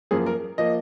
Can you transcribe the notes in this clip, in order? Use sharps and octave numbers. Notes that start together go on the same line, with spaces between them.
F#2 F3 A#3 G#4
A#4
F3 A#3 D#5